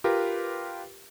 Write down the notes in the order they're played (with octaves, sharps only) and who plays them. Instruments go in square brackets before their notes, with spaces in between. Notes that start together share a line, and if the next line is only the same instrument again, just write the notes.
[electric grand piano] F4 G4 A#4 B4